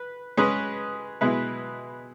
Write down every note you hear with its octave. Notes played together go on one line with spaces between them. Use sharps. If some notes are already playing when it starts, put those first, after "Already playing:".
Already playing: B4
G#3 C#4 G#4 B4
B2 G#3 E4 B4